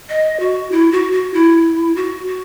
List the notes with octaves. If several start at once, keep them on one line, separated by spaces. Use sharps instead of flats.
D#5
F#4
E4
F#4
F#4
E4
F#4
F#4